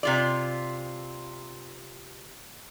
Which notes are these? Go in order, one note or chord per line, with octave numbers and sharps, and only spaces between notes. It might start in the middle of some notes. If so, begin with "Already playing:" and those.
C3 F4 D5